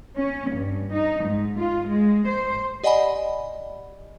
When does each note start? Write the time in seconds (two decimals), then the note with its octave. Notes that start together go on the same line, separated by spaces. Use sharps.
0.17 C#4
0.54 G2
0.93 D#4
1.25 G#2
1.58 F4
1.88 G#3
2.28 C5
2.84 G4 D5 D#5 F#5 G#5 B5